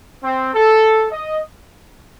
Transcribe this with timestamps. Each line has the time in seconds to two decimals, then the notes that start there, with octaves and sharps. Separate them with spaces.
0.22 C4
0.53 A4
1.12 D#5